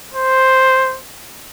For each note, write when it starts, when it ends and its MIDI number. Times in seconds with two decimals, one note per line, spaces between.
0.14 0.99 72